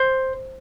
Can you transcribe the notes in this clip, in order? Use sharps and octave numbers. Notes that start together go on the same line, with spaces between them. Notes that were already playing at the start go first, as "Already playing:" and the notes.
Already playing: C5